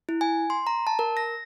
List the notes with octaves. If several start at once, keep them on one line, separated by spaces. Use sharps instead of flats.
E4
G#5
C6
A#5
A5
A#4
A#6